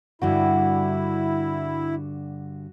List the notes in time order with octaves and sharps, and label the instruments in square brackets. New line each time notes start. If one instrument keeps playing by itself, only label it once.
[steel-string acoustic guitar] G2 D3 G5 [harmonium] E4 [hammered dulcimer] F#4